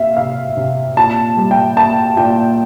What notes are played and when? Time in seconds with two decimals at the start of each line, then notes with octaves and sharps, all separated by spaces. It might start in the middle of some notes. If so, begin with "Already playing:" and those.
Already playing: C3 A#3 E5 F5
0.17 C3 F5
0.57 C3
0.97 A#2 A5
1.37 G3
1.51 G5
1.77 A#3 A5
2.17 A#2 G5